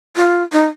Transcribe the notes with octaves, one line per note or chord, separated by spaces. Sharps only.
F4
D#4